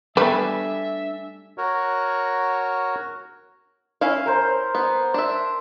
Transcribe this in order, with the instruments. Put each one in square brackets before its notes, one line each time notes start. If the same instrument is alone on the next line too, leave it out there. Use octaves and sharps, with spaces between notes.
[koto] G3 A3 [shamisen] B3 B4 [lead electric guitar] D4 G#5 [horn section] E5
[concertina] F#4 A#4 C#5
[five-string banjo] C#4 E4 F5
[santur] A#4 C5
[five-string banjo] B3
D4 E5